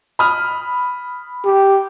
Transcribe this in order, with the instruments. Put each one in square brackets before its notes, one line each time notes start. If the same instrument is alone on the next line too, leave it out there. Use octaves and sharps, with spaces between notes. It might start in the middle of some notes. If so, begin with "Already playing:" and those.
[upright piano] B5 D#6 F6
[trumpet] G4